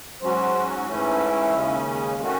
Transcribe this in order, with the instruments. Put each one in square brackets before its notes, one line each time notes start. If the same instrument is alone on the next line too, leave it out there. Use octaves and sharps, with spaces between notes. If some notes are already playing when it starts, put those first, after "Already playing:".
[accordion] G#2 F#3 C#4 F#4 [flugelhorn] C5
[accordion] G#2 E3 A3 C#4 [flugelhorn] E4
[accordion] D#2 C#3 G#3 C#4
D#3 A3 C#4 F#4